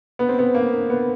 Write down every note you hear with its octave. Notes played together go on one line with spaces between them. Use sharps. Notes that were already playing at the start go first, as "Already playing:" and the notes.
B3
C4
B3
A#3
B3